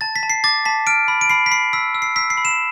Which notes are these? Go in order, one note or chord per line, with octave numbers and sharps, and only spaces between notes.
A5 A6
B6
A5
C7
D6 A6
A5 B6
F6 D7
B5
D7
B5 C7
B6
B5 C7
E6 B6
E6
C7
E6 B6
C7
B5
E7